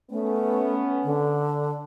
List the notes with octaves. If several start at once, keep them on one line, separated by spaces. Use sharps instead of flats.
A3 B3 C#4
D3